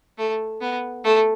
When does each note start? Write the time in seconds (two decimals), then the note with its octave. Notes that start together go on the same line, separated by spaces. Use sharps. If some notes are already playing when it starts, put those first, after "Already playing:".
0.18 A3
0.61 B3
1.04 A3